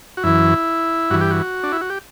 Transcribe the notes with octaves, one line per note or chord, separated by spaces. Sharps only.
F#4
F#2 E3 E4
G2 E3 F#4
G4
F#4
D4
E4
F#4
G4